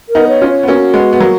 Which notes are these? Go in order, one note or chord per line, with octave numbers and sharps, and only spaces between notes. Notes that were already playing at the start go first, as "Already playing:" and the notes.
A#4
B3 D#4
C#5
C#4 F4
C#5
B3
A#3 C#4 F#4
G#3 B3
B3
F#3 A#3